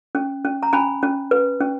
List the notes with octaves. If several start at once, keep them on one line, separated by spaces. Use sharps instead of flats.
C#4
C#4
A#5
C#4 G#5 B5
C#4
B4
C#4